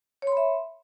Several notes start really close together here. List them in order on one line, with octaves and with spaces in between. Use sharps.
C#5 C6 B5 E5